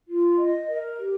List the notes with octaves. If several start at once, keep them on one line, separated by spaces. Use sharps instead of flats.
F4
D#5
A#4
G4